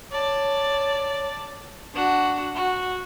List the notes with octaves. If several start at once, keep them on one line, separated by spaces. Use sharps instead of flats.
C#5 D5 A5
D4 F#4
F#4